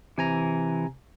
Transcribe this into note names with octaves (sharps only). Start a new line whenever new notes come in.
C3 E3 G#5 A#5